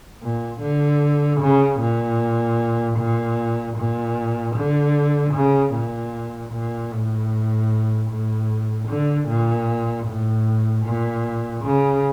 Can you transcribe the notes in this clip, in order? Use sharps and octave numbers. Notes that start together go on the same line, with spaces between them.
A#2
D3
C#3
A#2
A#2
A#2
D3
C#3
A#2
A#2
A2
A2
D3
A#2
A2
A#2
C#3